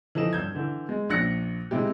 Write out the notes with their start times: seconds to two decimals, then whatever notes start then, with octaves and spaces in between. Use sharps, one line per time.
0.15 E3 F3 A4 D#5 E7
0.33 G2 G6 G#6
0.55 D3 E3
0.89 G#3
1.10 A#1 D4 F#6 A#6 C#7
1.71 C3 G#3 E4 G4